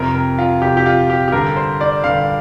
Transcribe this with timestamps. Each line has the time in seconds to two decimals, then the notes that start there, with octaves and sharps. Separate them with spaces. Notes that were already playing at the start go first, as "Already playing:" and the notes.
Already playing: F2 C3 A#4
0.15 A#4
0.39 F4
0.62 F2 C3 G4
0.77 G4
0.86 F4
1.10 G4
1.28 G4
1.32 G2 D3 A#4
1.56 C5
1.81 D5
2.04 G2 D3 F5